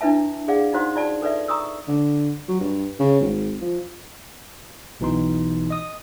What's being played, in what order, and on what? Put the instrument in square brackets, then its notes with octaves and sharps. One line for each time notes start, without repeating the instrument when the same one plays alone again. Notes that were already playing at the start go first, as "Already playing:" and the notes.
[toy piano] D4 E4 B4 E5 A5
G#4 D5 F5 F#5
D#4 F4 F#4 C5 F#5 C6
F4 D5 A5
A4 B4 D5 E5
A#5 C#6 D#6 E6
[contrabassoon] D3
F#3
G2
C#3
G#1
F3
[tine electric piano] B1 B2 E3 D#4 C6
D#5 D#6